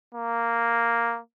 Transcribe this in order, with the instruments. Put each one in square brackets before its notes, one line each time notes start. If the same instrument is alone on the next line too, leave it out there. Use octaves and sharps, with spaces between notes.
[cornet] A#3